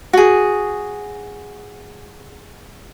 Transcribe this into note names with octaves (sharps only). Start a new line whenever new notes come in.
F#4 G#4